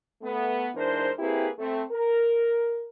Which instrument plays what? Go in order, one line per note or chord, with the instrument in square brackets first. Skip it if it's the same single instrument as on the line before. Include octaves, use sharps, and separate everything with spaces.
[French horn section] A3 B3
G#2 E3 D4 A#4 C5
A#3 C4 E4 G4 G#4 B4
A3 C4
A#4